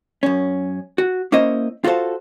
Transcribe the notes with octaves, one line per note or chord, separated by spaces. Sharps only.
F#2 C#4
F#4
A#3 C#4 E4 C5 D#5
F4 F#4 A4 C5 F5